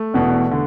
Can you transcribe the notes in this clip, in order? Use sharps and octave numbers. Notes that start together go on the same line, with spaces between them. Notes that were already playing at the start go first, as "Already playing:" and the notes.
Already playing: A3
E1 E2 B2
D3